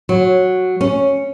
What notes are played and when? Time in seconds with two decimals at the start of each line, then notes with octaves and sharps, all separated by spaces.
0.09 F#3
0.81 C#4